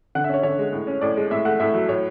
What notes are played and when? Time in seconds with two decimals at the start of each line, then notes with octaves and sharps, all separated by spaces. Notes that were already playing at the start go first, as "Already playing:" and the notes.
0.15 D3 F#5
0.24 E5
0.29 C#4 C#5
0.43 D3 C#5
0.59 G#3
0.73 A2
0.87 C#4
1.01 A2 D5
1.17 G#3
1.31 A2 E5
1.45 A3 F#5
1.60 A2 E5
1.74 F#3
1.89 A2 C#5